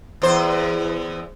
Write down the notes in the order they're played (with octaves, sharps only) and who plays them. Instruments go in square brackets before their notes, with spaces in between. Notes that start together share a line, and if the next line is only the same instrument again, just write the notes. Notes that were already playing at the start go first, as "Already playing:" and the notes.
[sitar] E2 C5